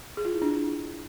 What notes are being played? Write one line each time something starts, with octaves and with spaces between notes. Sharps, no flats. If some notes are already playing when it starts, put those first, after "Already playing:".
G#4
F4
E4
D4